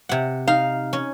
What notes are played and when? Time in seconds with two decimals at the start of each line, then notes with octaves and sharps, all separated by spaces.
0.09 C3 F#5
0.47 D#4 F5
0.93 C#4